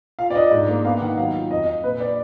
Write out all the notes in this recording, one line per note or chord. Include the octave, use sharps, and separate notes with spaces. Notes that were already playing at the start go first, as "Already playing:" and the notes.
F4 F5
D5
D4 D#5
G#2
A#3
B3 F5
D#3 F#5
F#3 F5
F4
F2 D#5
F2
A#2 B4
D4 D5